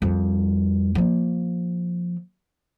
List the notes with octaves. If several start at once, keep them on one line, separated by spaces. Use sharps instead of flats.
F2 G3
F3 A#3